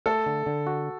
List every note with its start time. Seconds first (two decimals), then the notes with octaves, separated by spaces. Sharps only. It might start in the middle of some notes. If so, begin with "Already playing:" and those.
0.06 A3 A4
0.26 D3
0.46 D3
0.67 F#4